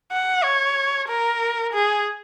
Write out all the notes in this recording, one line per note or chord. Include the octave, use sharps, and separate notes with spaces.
F#5
C#5
A#4
G#4